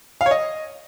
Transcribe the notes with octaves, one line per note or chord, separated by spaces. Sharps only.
F5
C#5
D#5